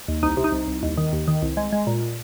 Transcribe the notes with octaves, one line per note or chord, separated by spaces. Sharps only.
D#2
C2 D#4
C3
D#4
C2
C2
D#2
D#3
D#2
D#3
C2
G#3
G#3
A#2